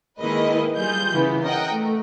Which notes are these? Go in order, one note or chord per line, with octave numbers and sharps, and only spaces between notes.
D#3 G#3 A#3 E4 B4 D#5
G3 F4 G#4 G6
C#3 E3 B3
A#4 D#5 F#5 G5
A3